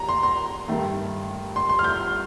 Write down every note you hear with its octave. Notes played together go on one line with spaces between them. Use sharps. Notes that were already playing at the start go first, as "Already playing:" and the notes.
Already playing: D#2 A#5
C6
C6
G2 D#3 A3
C6
C6
F6
G6